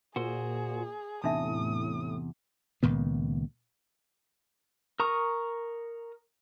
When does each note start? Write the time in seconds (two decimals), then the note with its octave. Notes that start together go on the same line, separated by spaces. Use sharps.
0.16 A#2 F#4 G#4 A#4 C5
1.24 E2 A2 C3 D4 D#4 E5 D#6
2.83 C#2 A#2 D#3 B3
5.00 A#4 A#5 C#6 D#6